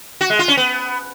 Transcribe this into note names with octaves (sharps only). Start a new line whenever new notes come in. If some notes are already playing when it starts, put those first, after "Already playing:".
F#4
G#3
F4
C#4
B3